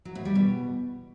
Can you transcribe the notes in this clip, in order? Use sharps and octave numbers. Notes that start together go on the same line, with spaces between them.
F#3
A2
G3
B2